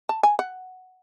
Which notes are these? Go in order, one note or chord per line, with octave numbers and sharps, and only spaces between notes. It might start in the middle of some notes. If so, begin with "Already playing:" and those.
A5
G#5
F#5